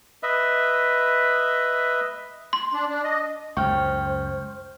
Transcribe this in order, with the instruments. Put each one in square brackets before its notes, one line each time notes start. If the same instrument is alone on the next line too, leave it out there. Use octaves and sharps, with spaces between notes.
[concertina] B4 D#5 E5
[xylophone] C6
[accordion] D4
D4
D#5
[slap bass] C#2 F#2 [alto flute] C5 [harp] G5 [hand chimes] C#6 F6